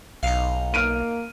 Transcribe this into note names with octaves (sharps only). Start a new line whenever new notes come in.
B1 D#4 F5
A#3 F6 D7 D#7